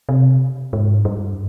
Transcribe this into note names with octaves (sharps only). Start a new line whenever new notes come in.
C3
G#2
G2